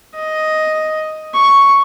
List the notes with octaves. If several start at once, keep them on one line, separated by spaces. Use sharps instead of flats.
D#5
C#6